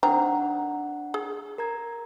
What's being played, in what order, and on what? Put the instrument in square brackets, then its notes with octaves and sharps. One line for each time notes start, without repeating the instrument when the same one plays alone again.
[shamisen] D#3 C4 A#5 [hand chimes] D4 F#5
[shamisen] G#4
[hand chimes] A#4 A#5 G#6